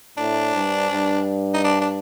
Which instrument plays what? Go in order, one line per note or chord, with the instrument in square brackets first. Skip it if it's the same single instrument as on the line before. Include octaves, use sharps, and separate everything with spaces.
[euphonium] A2 [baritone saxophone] D4
[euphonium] G2
G2
[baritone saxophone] D#4
D4
D4